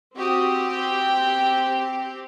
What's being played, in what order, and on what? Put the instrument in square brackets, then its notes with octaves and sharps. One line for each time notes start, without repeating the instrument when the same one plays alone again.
[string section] C4 G4 [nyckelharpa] F#4 D#6
[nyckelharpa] G5